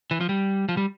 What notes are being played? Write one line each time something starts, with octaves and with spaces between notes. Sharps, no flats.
E3
F3
G3
F3
G3